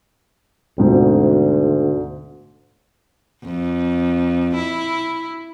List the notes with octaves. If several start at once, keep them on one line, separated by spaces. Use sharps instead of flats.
D2 G#2 B2 C4
F2
E4